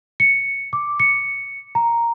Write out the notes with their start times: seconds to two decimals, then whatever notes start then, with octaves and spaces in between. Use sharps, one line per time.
0.20 C#7
0.73 D6
1.00 C#7
1.75 A#5